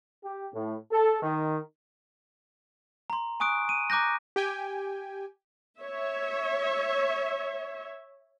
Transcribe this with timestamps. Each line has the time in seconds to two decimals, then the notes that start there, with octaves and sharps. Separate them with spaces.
0.23 G4
0.53 A2
0.91 A4
1.21 D#3
3.10 A#5 C6
3.40 G#5 C#6 D#6 F#6 D7
3.69 D#7
3.90 A#5 D6 F#6 G6 A#6
4.36 G4 G5 G#5
5.81 C#5 E5